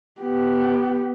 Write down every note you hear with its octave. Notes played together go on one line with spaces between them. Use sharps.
B3 G4